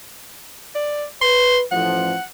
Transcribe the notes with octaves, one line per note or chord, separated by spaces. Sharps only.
D5
B4 C6
A1 F3 F#5